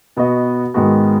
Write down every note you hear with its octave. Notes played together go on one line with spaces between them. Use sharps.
B2 B3 F#4 D#5
G#2 D#3 G#3 B3 F#4